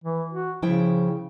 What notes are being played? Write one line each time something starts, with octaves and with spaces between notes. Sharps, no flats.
E3
F#4
C#3 F3 E4 G5